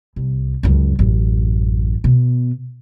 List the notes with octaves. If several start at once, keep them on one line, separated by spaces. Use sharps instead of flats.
C2
C#2 F#2
A1 F#2
B2